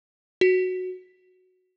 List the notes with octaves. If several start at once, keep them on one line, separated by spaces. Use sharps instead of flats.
F#4